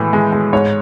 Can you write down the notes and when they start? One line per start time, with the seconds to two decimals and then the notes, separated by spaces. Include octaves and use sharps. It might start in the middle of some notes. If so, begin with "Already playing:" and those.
Already playing: A2 E3 G#3 B3
0.13 G#3
0.32 G#3
0.53 G#2 C#5